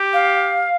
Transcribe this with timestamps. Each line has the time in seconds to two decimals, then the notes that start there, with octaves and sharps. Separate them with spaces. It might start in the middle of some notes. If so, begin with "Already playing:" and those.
Already playing: G4
0.13 F5